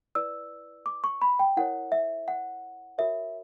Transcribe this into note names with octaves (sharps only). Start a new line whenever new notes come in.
E4 B4 D5 E6
D6
C#6
B5
G5
E4 A#4 C#5 F#5
E5
F#5
F#4 A#4 C#5 E5